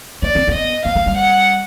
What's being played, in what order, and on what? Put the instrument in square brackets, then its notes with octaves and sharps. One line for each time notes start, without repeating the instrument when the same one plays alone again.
[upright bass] B3 [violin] D5
[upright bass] C4
B3
[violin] D#5
[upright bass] A#3 [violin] F5
[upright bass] A3
G3
[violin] F#5